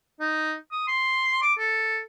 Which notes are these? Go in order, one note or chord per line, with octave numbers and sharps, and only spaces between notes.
D#4
D#6
C6
D6
A4